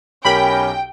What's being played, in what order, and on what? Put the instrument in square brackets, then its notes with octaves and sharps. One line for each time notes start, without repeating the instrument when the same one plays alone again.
[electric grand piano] B1 G4 A#4 [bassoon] C#4 [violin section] G5 [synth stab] B5